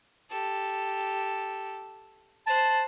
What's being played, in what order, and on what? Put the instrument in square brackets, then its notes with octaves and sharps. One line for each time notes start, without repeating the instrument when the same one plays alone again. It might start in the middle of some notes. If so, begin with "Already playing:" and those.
[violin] G4 A4
[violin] C5 F#6 [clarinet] A5